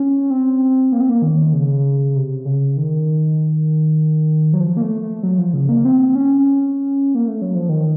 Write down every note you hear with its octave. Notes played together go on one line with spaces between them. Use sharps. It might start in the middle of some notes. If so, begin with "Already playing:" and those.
Already playing: C#4
C4
A#3
C4
A#3
D#3
C#3
C3
C#3
D#3
F#3
F3
A#3
A3
A3
F#3
F3
C#3
A#3
C4
C#4
A#3
A3
F#3
F3
D#3